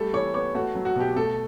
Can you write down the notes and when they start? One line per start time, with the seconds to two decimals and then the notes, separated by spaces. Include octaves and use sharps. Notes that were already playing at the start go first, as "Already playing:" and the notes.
Already playing: G3 A3 A4
0.13 E3 C#5
0.34 B3 C#5
0.54 A3 F#4
0.75 F#3
0.85 F#4
0.96 B2 G4
1.16 A3 A4